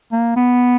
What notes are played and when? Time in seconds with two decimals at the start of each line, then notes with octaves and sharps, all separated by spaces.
0.12 A#3
0.36 B3